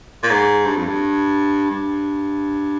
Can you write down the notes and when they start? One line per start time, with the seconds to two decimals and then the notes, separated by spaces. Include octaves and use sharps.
0.23 A#2
0.30 G#2
0.66 G2
0.76 F2
0.87 G2
1.71 G2